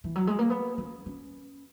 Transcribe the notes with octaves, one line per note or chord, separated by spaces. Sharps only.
E3
F#3
G#3
A#3
B3
C#4
C#4